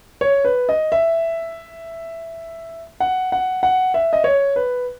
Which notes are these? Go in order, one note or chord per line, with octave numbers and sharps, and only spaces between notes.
C#5
B4
D#5
E5
F#5
F#5
F#5
E5
D#5
C#5
B4